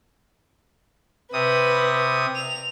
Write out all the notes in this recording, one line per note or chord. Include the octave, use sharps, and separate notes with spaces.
C3 B4 D#6
F7